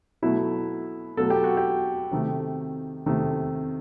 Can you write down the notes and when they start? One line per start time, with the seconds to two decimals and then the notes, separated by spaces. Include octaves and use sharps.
0.22 B2 F#3 A3 E4
1.17 B2 F#3 A3 A4
1.30 G4
1.44 F#4
1.57 G4
2.11 C3 D#3 A3
3.06 C3 D#3 A3